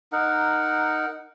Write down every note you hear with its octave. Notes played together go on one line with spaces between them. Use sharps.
D#4 A#4 F#5